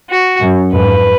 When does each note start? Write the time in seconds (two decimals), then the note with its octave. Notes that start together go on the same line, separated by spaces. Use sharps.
0.10 F#4
0.42 F#2
0.72 F2 G#2 B4